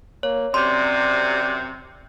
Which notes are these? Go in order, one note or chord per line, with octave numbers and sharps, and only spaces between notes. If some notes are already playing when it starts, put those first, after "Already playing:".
A#3 C#5
F#2 C3 D5 C6